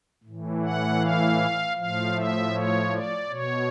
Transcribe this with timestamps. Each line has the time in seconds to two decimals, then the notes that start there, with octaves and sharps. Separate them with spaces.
0.24 A2 E3
0.62 F#5
1.01 F5
1.77 A2 F3 F5
2.16 E5
2.53 C#5
2.92 D5
3.29 B2 C#5